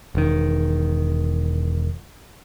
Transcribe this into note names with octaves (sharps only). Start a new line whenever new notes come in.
E1 D#3